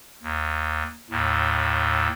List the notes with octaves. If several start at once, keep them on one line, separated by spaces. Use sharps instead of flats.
D#2
D#2 A2